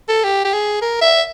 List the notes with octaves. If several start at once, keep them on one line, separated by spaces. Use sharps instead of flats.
A4
G4
G4
G#4
A#4
E5